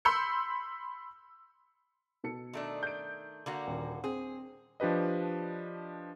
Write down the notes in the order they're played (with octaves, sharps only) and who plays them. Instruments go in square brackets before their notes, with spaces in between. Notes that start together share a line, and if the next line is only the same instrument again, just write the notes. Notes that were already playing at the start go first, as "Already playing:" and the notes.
[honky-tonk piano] B5 C6 E6 G6 C#7
[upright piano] B2 A4 C#7
[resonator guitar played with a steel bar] D#3 A3 D4
[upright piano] G6 D7
[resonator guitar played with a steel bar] D3 A#3 F#4
[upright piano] D#1
[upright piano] C4 [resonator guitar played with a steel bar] G#4
[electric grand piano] F3 D4 G4 B4 D#5